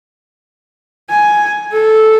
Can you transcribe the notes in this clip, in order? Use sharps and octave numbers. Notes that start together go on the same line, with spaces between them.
G#5
A4